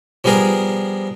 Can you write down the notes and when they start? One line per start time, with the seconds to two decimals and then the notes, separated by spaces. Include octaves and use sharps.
0.24 F3 G3 B3 G#4 A#4